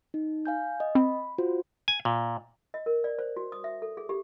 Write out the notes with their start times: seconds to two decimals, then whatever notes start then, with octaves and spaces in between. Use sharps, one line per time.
0.14 D#4
0.45 F5 G#5 G6
0.80 D#5
0.95 C4 B5
1.38 F4 F#4 C5
1.88 G#5
2.05 A#2
2.74 D#5
2.86 A#4
3.04 D5
3.19 C5
3.37 F#4
3.52 D#6
3.64 E5
3.82 A4
3.97 G#4
4.09 G4